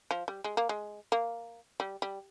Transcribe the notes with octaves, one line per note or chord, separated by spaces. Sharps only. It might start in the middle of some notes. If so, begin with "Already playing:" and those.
F3
G3
G#3
A#3
G#3
A#3
G3
G3